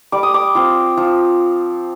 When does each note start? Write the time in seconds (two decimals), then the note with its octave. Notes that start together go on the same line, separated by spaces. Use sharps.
0.12 G3 D6
0.23 D#6
0.34 D6
0.55 C4 F4
0.97 F3